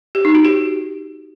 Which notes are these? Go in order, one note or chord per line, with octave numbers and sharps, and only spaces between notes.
G4
D#4
F#4
G4